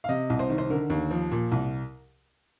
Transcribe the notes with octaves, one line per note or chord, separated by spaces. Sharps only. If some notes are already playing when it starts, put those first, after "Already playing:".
F5
C3 D#5
C2
C5
D#3
C5
D3 A#4
D#2
F3
A#2
C2